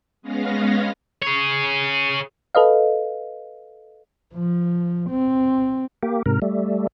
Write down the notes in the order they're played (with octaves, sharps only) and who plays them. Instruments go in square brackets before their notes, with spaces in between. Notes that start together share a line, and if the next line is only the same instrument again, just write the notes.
[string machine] G#3 B3 C#4 F5 A#6
[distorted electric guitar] G#4 C#5
[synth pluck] A4 B4 D#5 F5
[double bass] F3
C4
[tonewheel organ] A#3 G4
G#2 C3 A#4
G3 A3